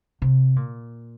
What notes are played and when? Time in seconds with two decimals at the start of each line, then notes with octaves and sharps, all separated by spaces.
0.22 C3
0.56 A#2